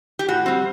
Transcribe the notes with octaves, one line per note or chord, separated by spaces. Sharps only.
G4
A2 F#4
G3 C4